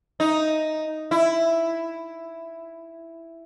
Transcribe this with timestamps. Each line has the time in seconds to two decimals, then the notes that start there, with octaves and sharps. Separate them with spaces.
0.20 D#4
1.11 E4